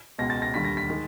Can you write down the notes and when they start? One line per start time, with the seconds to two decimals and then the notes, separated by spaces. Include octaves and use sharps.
0.18 C#2 B2 G#3 A#6
0.30 A6
0.42 A#6
0.54 D#2 D3 G3 B6
0.65 A#6
0.77 B6
0.90 D#3 G#3